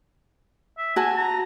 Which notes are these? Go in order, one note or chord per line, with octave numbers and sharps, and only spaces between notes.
E5
F#4 G#5 A5
A#5